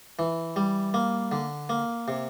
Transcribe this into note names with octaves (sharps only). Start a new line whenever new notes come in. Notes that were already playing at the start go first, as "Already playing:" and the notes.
E3
G3
A#3
D3
A#3
C3